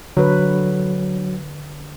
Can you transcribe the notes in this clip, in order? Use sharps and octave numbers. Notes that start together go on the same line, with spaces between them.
D3 F#3 B4